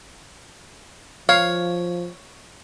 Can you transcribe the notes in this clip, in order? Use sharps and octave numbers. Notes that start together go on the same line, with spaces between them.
F3 C#5 F5